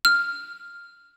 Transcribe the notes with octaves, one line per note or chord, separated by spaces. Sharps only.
F6